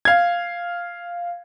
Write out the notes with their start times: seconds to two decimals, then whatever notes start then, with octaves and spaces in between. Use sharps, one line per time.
0.05 F5 G#6